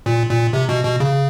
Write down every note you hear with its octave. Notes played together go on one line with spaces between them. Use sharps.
A#2
A#2
C3
B2
B2
C#3